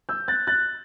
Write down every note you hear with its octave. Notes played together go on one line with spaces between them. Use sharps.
E6 G6
F#6 A6
F#6 A6